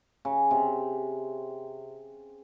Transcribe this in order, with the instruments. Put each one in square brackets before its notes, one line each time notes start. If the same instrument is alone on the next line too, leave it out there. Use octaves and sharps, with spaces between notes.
[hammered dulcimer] C#3
C3